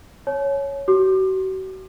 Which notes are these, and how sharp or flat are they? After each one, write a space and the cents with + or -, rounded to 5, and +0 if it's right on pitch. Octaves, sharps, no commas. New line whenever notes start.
C#5 +0 A5 -45
F#4 +40 D6 +30